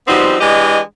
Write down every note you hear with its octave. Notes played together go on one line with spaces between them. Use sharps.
F3 G3 B3 C4 D#4 F#4
E3 G#3 D4 G4 D#5